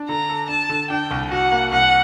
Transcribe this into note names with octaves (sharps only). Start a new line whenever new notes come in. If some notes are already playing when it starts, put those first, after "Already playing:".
Already playing: D4
D3 A#5
A4
D4 A5
D3
D4 G5
C2
F#4 F#5
A#3
C2 F#5